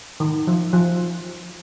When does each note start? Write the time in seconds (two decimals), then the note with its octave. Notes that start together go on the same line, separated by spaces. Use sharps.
0.20 D#3
0.47 F3
0.73 F3